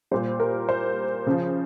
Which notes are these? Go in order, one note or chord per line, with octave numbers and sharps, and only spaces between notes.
A#2 G3 C5
A#4
C5
C#3 F3